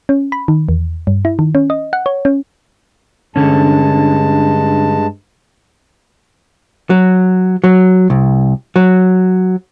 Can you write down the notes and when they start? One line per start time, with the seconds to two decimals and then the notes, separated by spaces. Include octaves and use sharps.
0.09 C#4
0.32 B5
0.48 D#3
0.69 E2
1.07 G2
1.25 E4
1.39 D#3
1.55 C#4
1.70 D#5
1.93 F#5
2.06 C#5
2.25 C#4
3.36 G2 D3 G#3 C#4 A5
6.90 F#3
7.64 F#3
8.10 C2
8.76 F#3